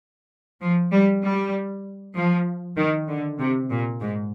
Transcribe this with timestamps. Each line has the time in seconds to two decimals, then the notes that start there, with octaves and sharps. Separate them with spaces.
0.61 F3
0.92 G3
1.23 G3
2.16 F3
2.77 D#3
3.08 D3
3.39 C3
3.70 A#2
4.00 G#2